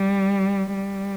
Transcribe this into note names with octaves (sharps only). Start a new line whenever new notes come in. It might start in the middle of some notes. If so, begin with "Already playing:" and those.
Already playing: G3
G3